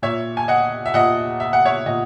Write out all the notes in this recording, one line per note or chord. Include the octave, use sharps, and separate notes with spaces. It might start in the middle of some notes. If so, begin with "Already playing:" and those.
A#2 C#5 E5
G#5
D#5 F#5
E5
A#2 D#5 F#5
E5
F#5
C#5 E5
A#2 D#5